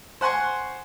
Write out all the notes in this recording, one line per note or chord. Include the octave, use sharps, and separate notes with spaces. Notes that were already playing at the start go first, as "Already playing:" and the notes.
C5 F#5 G#5 C6 C#6